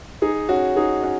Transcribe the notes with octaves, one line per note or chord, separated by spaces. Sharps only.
D#4 G#4
C#4 F#4
D#4 G#4
C#4 F#4